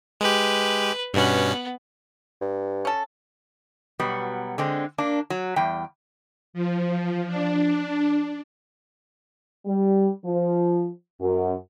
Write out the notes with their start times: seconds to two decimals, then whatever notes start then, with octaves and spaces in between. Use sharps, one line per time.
0.21 G#3 G4 B4
1.14 G2 B2 B3 C#4
2.41 G2
2.85 C#4 A4
3.99 B2 F#3 G3 B3
4.58 D3 G#3 C4
4.98 A#3 D4
5.30 F#3
5.56 E2 G3 G5
6.54 F3
7.27 D4
9.66 G3
10.24 F3
11.20 F#2